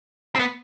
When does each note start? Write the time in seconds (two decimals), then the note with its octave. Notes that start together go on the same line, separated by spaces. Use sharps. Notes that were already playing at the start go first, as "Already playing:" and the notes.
0.35 C4
0.39 B3